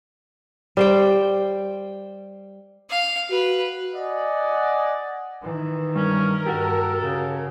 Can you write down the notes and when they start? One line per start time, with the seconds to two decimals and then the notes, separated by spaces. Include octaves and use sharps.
0.77 G3 C5 G5
2.89 F5
3.30 F#4 B4
3.96 D5 D#5 F#5 G#5
5.42 D#3 E3
5.96 G2 C#4 A#4
6.46 G2 F#4 G4 A4
7.00 C#3